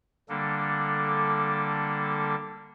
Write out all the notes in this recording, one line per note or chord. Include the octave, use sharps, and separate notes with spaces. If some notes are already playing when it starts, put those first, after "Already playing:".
D3 G3 A#3 D4 A4